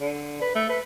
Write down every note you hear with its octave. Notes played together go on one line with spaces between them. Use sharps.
D3
B4
A3
B4